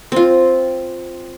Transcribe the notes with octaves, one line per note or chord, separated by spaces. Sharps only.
C4 F4